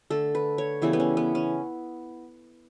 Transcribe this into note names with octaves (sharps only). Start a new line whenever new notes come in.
D3 A3 A4
B4
C#5
C#3 E3 G3 B3 E4
B3
C#4
B3
C#4